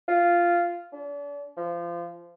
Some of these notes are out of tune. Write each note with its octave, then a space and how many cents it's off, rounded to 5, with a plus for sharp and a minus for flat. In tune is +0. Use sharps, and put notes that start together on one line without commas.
F4 -10
D4 -40
F3 -25